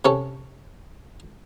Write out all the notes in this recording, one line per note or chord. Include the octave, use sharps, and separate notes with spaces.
C3 C#4 A4